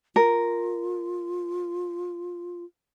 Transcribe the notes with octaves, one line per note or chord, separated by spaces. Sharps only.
F4 A#4